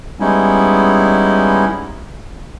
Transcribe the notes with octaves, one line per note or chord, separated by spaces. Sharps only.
G3 G#3 B3 C#4 D#4 E4